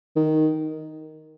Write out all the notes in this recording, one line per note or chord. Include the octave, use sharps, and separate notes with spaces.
D#3